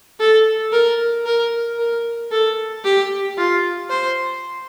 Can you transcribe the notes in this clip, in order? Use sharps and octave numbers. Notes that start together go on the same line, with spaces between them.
A4
A#4
A#4
A#4
A4
G4
F4
C5